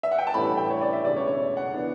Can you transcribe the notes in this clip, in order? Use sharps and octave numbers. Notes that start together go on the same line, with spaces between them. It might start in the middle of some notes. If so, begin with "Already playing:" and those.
E5
F#5
G5
A5
A1 G2 E3 A3 C#4 B5
G5
C#5
D5
E5
E1 D2 C#3 D5
C#5
C#5
F#5
E3 B3 D4